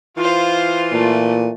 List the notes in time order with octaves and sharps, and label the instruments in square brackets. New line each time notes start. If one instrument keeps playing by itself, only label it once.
[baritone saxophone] E3 [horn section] F4 [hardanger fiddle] C5 F5
[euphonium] A#2 [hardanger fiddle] A3